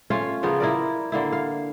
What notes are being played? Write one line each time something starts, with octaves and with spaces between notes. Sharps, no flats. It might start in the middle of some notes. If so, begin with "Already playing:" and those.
A3 C#4 F4
C#3 F3 B3 A#4
E4 A#4 D5
D3 A#3 E4
F5